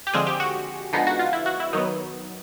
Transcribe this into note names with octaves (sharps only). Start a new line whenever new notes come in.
G4
D3 F3 G#3 C4 G#4
G4
F#4
D3 F3 G#3 B3 D#4
F#4
F4
E4
F#4
E4
D#3 F#3 B3 D#4